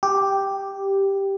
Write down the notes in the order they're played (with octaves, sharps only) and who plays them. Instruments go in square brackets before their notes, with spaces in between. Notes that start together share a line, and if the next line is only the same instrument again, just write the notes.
[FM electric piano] G4